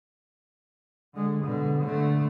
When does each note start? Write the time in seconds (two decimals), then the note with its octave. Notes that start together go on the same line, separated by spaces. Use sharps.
1.15 D3 G#3
1.43 B2 D3
1.83 D3 A3